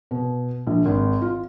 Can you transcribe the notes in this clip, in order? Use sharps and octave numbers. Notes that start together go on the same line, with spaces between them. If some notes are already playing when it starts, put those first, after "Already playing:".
B2
A#1
G#1
F4